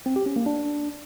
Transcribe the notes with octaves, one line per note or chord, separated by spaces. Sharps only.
C4
G4
C#4
A#3
D4